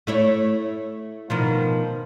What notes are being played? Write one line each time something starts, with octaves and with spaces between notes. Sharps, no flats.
A3 E4 C#5
B2 D#3 F3